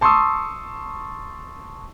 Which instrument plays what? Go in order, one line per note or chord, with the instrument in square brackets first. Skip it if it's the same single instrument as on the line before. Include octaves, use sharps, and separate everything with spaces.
[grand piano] A5 C6 C#6 D#6 E6